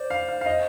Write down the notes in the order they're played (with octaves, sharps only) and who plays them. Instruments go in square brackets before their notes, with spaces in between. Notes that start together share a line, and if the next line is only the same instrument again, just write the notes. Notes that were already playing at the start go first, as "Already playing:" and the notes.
Already playing: [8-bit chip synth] C5 [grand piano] D5
[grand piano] F5
F5
F5
D#5